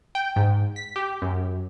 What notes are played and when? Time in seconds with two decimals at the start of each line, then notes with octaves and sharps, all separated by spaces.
0.15 G5
0.36 G#2
0.76 B6
0.96 G4
1.22 F#2